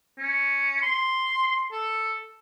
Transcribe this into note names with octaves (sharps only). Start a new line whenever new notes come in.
C#4
C6
A4